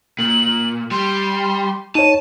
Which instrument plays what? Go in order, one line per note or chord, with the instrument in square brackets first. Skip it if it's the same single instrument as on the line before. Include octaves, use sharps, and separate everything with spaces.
[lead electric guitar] A#2 [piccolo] F#7
[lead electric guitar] G3 [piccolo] C6
[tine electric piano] D#4 C#5 [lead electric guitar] A5 [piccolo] D#7